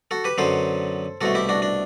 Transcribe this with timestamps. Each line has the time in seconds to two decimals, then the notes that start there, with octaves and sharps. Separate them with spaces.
0.11 F#4 A4
0.24 G4 B4
0.38 F#2 D3 F#3 B3 A4 C5
1.21 C2 B2 A3 F#4 A4
1.35 E4 G4
1.49 D4 F#4
1.62 D4